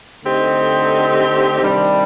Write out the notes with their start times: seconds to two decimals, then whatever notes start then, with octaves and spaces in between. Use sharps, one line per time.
0.24 D3 A3 C4 D#4 G4
1.61 C3 D#3 G3 D4